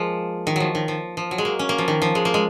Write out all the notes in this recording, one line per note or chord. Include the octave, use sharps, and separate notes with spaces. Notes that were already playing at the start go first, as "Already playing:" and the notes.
Already playing: F3 G#3 A#3
D#3
F3 F#3
D#3
F3
F3
F#3
G#3
A#3
C#4
A#3
F3
D#3
F3
G#3
A#3
G#3